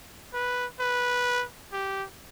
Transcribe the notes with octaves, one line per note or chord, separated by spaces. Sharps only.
B4
B4
G4